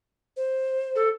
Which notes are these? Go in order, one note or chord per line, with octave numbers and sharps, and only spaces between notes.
C5
A4